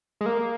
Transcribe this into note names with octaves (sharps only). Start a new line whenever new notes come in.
G#3
A#3